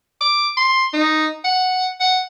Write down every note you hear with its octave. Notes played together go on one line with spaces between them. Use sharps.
D6
C6
D#4
F#5
F#5